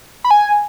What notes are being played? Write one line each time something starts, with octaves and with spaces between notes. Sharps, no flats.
B5
G#5